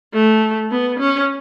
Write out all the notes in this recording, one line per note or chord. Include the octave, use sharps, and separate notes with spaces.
A3
B3
C#4